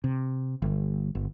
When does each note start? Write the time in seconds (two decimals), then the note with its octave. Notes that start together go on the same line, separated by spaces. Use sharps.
0.04 C3
0.62 G1
1.15 G1